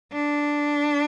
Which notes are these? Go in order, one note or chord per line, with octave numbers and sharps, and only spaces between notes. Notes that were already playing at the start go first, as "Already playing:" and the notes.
D4